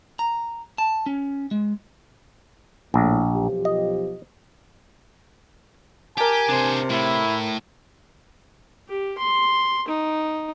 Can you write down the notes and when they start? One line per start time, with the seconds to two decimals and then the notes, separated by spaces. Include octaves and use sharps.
0.19 A#5
0.78 A5
1.06 C#4
1.51 G#3
2.94 A#1 A2
3.33 B1 F3 G4
3.65 D#5
6.17 G4 A#4 G#5 A5
6.49 C3 D4 C5
6.90 A2 E4
8.89 G4
9.18 C6
9.88 D#4